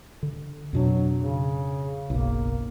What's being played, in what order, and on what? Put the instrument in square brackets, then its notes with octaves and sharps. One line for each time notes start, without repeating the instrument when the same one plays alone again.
[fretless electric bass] D3
[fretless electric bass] F2 B2 D4 [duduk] F#3
[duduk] C#3
[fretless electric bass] F#1 B1 [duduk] A#3